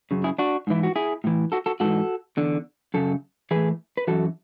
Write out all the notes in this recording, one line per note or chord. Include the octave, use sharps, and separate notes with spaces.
F#2 C#3
E4 G#4
D4 F#4
G#2 E3 E4
F#4
E4 G#4
A2 E3
F#4 A4
F#4 A4
G#2 E3 F#4 A4
E2 D3
F#2 C#3 A4
A2 E3 G#4 B4
B4
F#2 C#3 E3 F#4 A4